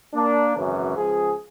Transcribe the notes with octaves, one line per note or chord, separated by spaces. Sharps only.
A#3 D4
G#1 F#2 C#3 E3
C#2 F3 G#4